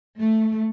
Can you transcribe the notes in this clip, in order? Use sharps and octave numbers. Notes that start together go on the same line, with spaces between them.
A3